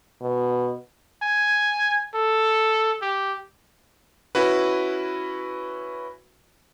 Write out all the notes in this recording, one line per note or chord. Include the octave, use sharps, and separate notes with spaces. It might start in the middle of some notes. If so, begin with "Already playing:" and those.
B2
G#5
A4
G4
C#4 E4 F#4 B4